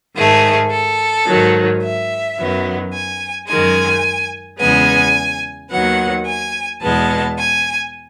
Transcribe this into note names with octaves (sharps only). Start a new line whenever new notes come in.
G#2 D#3 A3 G#4
A4
G#2 D#3 F#3
E5
F#2 D#3 F#3 B3
G#5
F#2 D#3 G#3 G#5
E2 C#3 G#3 B3 G#5
D#2 D#3 F#3 B3 F#5
G#5
E2 B2 G#3 B3 A5
G#5